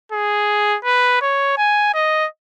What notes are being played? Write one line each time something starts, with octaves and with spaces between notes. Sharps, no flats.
G#4
B4
C#5
G#5
D#5